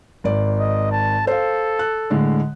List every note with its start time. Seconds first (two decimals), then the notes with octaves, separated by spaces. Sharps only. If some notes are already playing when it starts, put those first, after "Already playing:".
0.24 G#1 D5
0.60 D#5
0.92 A5
1.27 A4 C5 F5
1.79 F#6
2.10 A2 D3 G#3